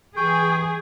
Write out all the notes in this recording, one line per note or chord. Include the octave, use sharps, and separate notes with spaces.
E3 G#4 G5 C#6